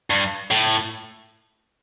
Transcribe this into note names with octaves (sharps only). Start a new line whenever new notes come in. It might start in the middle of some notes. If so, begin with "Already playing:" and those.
G2
A2